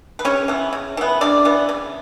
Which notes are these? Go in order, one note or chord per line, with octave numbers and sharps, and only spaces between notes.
B4
C#3 C#4 C#5
E3 B3
C#3
E3 B3
C#3 D4 D5
E3 B3
C#3